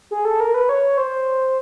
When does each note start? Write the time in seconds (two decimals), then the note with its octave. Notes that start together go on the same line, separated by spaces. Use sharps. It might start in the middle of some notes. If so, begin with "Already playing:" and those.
0.11 G#4
0.25 A4
0.40 A#4
0.54 B4
0.69 C#5
0.97 C5